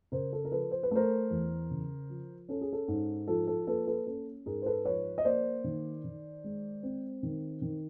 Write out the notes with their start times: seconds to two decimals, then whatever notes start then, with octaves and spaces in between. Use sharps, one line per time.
0.12 C#3 A#4 C5
0.33 A4
0.45 A#4
0.52 F3 A4 B4
0.71 C5
0.83 B4
0.91 A3 A#4 C5
1.31 E2
1.71 C#3
2.10 F3
2.49 C#4 A4
2.61 G#4
2.73 A4
2.88 G#2
3.28 F3 A4
3.47 A4
3.67 A#3 A4 B4
3.87 A4 B4
4.07 C#4 A4
4.46 G#2 G#4 A#4
4.62 C5
4.66 A4 B4
4.85 F3 B4 C#5
5.18 D#5
5.25 A#3 C5 D5
5.64 D#3
6.05 D#3
6.44 G#3
6.83 C4
7.23 D#3
7.62 D#3